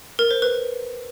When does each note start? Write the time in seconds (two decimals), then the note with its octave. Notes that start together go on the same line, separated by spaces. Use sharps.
0.19 A#4
0.31 C5
0.42 B4